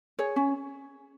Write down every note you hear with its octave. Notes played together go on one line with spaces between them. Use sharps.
G#4 C#5
C#4